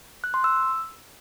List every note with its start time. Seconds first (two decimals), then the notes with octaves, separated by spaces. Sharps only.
0.24 F#6
0.34 C6
0.44 E6